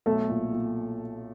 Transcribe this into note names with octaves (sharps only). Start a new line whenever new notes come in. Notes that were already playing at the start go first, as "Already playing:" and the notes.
B1 A3 A4
A#2
A#2